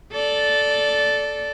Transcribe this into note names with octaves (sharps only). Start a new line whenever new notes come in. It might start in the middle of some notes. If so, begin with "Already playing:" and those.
A4 D5